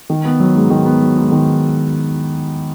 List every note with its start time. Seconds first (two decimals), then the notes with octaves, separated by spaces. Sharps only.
0.10 D#3
0.25 B3
0.40 F#3
0.55 G#2
0.70 D#3
0.85 B3
1.01 F#3
1.17 G#2
1.32 D#3